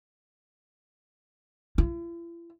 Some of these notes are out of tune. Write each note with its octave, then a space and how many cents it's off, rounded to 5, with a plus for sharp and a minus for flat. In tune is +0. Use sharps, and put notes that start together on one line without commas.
E4 +45